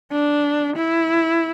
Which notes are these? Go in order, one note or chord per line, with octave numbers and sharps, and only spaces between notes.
D4
E4